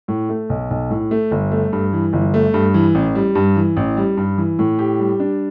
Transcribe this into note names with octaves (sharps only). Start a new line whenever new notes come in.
A2
A3
B1
B1
A2
A3
G1
A3
G2
E3
G1
A3
G2
E3
A1
G3
G2
E3
A1
G3
G2
E3
A2
G4
G3
D4